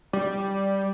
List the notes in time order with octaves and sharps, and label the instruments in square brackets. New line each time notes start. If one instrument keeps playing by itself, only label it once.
[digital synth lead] G3